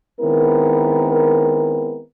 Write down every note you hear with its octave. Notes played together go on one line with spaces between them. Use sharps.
D#3 G#3 B3 C4 E4 A#4